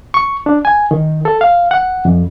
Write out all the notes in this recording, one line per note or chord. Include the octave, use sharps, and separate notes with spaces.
C#6
D4
G#5
D#3
A4
F5
F#5
F2